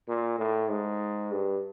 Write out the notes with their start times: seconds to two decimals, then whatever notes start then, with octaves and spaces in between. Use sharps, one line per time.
0.08 A#2
0.39 A2
0.70 G#2
1.32 G2